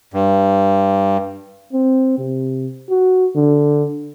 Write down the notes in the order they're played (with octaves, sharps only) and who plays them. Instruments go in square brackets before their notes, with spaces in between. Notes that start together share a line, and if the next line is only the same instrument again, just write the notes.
[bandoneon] G2
[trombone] C4
C3
F#4
D3